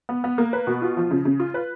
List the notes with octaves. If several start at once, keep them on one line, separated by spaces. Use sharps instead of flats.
B3
B3
A#3
B4
B2
F4
F3
C#3
C#3
F4
B4